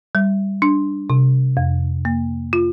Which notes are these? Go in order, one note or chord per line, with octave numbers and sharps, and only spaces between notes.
G3
D4
C3
F2
A#3
F4